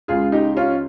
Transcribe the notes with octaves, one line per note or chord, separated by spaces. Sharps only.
C#2 C#3 F4 G#4
D#4 G4
C#4 F4